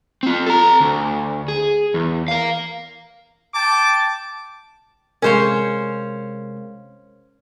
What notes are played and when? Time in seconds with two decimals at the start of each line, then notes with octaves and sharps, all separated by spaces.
0.23 C4 F4
0.46 A4 A#5
0.80 D2
1.48 G#4
1.94 E2
2.28 A#4 F5
3.53 G5 A5 D6
5.22 C3 G#3 C#4 A#4 C5 C#5 F5